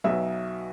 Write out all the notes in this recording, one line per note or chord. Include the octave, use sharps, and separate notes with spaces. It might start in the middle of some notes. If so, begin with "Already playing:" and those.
B1 B2 F#3 E5